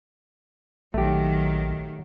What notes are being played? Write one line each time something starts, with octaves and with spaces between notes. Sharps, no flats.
A#1 D#3 F#3 A3 G4